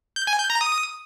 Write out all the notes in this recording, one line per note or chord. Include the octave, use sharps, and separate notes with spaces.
G6
G#5
G6
A#5
D#6